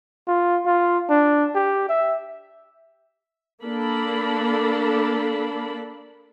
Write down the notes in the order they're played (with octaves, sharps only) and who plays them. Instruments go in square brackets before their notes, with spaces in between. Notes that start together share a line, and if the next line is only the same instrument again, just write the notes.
[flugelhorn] F4
F4
D4
G4
E5
[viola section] A#3 D4 A4 B5